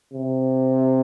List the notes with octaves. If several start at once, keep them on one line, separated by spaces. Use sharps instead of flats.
C3